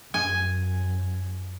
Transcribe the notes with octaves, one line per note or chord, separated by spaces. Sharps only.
F#2 G#5